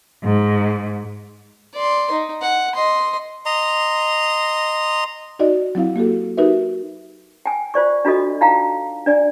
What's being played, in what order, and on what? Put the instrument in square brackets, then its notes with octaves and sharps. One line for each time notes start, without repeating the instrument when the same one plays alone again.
[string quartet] G#2
[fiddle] D5 C6
D#4
F#5
D#5 C6
[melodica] D#5 A#5 C6
[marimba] D#4 F#4 D5 D#5
F#3 C4 E4 F5
A#3 F#4 G4 A4
D#4 F#4 G4 A#4 B4 E5
[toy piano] G5 G#5
F4 C5 D5 C#6
D4 F4 F#4 A4 D#5
D#4 F4 F5 G5 A#5
D4 D5 G#5